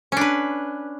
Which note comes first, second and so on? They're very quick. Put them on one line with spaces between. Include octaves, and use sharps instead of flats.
C#4 D4 B4